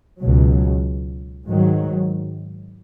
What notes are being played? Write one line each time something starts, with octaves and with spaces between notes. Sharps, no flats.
C#2 B2 F#3
G#2 D#3 F#3